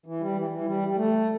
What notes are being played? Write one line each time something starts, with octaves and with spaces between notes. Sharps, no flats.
E3
G3
E3
E3
G3
G3
A3